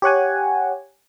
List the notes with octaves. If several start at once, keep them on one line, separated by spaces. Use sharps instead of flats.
G4 C#5 F#5 G#5